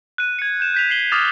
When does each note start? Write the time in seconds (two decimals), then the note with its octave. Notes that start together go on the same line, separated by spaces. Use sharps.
0.18 F#6 D#7
0.39 G#6 C#7
0.60 G6 E7
0.74 G6 B6 F7
0.90 G6 C7 E7 F#7 G7
1.11 D6 D#6 F6 A6 E7